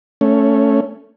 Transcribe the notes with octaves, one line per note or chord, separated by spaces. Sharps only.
A3 C#4